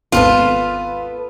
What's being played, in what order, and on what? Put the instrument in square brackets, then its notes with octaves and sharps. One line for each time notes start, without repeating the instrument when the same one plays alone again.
[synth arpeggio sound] G#1 D#2 C4 [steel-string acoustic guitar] B3 A4 B4 [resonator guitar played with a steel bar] F4